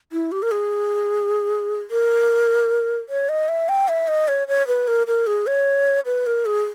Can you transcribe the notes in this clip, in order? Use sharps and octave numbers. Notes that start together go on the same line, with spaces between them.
E4
G4
A#4
G#4
A#4
C#5
D#5
E5
G5
E5
D#5
C#5
C#5
B4
A#4
A#4
G#4
C#5
B4
A#4
G#4